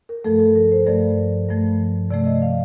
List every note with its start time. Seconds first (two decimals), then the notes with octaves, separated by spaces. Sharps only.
0.09 A#4
0.24 G2 F3 A3 A4
0.40 A4
0.56 A#4
0.72 C5
0.86 G2 F3 A3 D5
1.49 G2 F3 A3
2.11 C3 F3 A3 D5
2.26 D#5
2.42 F5